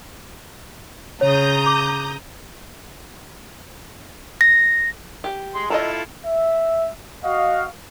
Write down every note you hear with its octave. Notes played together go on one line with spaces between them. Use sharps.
C#3 C#5 A#5 D#6 G6
D6
A#6
G4
G#3 C6
E4 F4 A4 D#5 A5 A#5
E5
F#4 D#5 F5